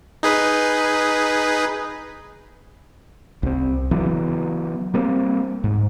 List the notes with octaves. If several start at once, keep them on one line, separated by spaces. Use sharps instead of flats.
D#4 G#4 B4
C2 C4
C#3 E3 F#3 B3
G3 A#3 C4
G#2